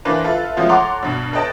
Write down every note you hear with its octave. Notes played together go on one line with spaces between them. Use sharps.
E3 A#3 D4 B4 C5
F4 A4 B4 E5
F3 G#3 A3 B3 C#4 F4
A4 C#5 F#5 A#5 C6 D6
G2 B2
A4 B4 C#5 D#5 G5 A5